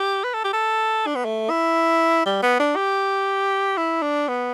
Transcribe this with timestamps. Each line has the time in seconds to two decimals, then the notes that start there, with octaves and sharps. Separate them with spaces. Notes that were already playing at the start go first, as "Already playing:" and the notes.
Already playing: G4
0.24 B4
0.34 A4
0.44 G4
0.53 A4
1.07 D4
1.15 B3
1.25 A3
1.50 E4
2.26 G3
2.43 B3
2.59 D4
2.76 G4
3.77 E4
4.02 D4
4.28 B3